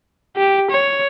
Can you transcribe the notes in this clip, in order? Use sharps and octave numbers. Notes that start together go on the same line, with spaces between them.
G4
C#5